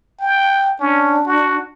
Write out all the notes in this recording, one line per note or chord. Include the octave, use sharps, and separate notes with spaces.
G5
C#4 D4
F#4